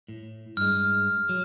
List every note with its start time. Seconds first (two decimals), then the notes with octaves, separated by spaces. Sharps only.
0.09 A2
0.57 G2 G#3 F6
1.29 F#3